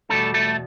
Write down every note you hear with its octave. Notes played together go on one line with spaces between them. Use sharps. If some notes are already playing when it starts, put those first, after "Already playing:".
E2 B2 G3 A3 A4
A3 A4